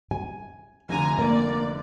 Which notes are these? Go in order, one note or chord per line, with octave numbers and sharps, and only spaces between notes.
G#5
F1 D3 G#5 A#5
A#3 D5